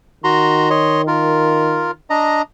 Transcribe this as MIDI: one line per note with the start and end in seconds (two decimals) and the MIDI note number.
0.24 1.96 51
0.24 0.70 66
0.24 0.70 82
0.24 0.70 84
0.70 1.02 73
0.70 1.02 75
0.70 1.02 84
1.07 1.91 65
1.07 1.91 70
2.10 2.42 62
2.10 2.42 75
2.10 2.42 82